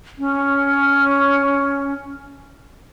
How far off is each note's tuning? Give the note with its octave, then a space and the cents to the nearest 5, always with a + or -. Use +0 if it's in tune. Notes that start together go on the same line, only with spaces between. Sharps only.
C#4 +10